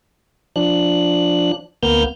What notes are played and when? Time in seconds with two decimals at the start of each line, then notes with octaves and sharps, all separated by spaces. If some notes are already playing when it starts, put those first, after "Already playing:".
0.56 F3 D4 F#6
1.83 D2 A#3 B3 F6 G6